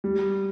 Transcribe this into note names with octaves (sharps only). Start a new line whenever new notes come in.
G3